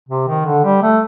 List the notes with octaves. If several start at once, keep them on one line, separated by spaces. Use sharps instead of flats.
C3
D#3
D3
G3
A3